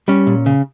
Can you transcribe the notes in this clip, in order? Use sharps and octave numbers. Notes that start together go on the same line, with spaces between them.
G3 C#4
A#2
C#3